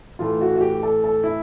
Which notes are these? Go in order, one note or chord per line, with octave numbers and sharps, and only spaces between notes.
A2 E3 A3 F4
F#4
F#4
G4
A4
A4
E4